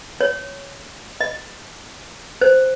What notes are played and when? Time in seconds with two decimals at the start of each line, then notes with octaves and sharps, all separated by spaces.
0.21 C#5
1.21 D#5
2.41 C5